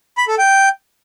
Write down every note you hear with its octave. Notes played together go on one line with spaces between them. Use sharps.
B5
A4
G5